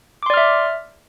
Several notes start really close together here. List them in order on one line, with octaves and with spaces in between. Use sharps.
D6 C6 D5 F6 E5